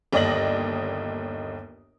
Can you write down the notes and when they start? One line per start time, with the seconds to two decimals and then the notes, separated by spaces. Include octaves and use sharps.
0.13 G1 D#2 D5 D#5 A#6 F#7